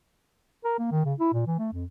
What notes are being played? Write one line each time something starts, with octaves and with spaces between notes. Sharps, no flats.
A#4
A#3
D#3
C#3
E4
A#2
E3
A3
F2